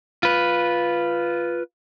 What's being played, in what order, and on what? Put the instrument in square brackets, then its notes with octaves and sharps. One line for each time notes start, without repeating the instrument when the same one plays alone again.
[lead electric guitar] F4 B4